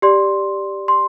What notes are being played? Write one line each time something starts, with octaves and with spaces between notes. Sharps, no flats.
G4 D5 C6
C6